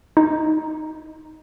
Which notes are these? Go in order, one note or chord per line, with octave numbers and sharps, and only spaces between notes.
D#4